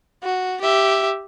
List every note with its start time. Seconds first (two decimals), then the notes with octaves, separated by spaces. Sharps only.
0.23 F#4
0.62 G4 E5